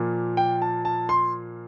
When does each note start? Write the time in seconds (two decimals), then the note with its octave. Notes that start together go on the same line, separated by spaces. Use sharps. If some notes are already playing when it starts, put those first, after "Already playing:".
Already playing: A#2 F3 A#3
0.37 G5
0.62 A5
0.85 A5
1.09 C6